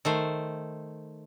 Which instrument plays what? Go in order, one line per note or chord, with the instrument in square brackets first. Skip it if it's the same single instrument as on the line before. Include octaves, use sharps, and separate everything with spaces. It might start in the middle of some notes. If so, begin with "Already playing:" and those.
[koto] D#3 A3 C5